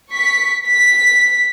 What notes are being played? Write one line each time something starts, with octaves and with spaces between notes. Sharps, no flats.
C#6 B6
B6